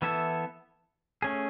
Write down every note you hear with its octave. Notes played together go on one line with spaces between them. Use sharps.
E3 B3 E4 A4 E5
A3 C#4 G#4